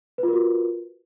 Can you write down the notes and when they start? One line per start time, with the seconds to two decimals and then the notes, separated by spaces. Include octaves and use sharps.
0.18 B4
0.23 F4
0.28 A#4
0.33 F#4